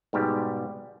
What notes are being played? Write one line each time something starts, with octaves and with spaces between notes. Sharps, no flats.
G#2 B2 G3 G4